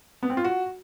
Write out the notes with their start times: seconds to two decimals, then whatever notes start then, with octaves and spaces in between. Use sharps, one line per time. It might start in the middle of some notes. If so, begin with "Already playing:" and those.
0.23 B3
0.30 C4
0.37 F4
0.44 F#4